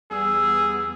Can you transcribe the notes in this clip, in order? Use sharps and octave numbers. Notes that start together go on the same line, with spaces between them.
E2 G3 B3 G#4 E6